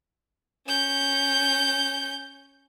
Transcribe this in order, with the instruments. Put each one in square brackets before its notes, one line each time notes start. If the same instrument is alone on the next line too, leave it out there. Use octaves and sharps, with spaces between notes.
[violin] C#4 G6